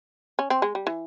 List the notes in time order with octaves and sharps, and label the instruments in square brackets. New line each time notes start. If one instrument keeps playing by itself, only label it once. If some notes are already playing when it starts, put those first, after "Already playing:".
[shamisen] C#4
C4
G#3
G3
E3